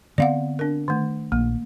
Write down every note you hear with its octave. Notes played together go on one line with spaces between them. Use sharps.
D3 B3 C4 D5 F5 F#5
D4 A#4
D#3 A3
A#1 A#3